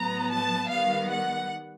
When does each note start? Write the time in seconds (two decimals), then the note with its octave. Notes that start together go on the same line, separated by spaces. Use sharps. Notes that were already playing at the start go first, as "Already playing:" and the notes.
Already playing: A2 F#3 B3 A#5
0.31 A5
0.69 D#3 G3 B3 F5
1.09 F#5